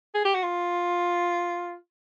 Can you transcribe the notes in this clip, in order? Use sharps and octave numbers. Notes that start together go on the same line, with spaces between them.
G#4
G4
F#4
F4